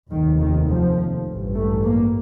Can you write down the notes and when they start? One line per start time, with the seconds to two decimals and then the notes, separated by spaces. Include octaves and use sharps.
0.11 F1 D#2 D#3
0.39 D#3
0.68 F3
1.26 A1 G2
1.55 A3
1.84 A#3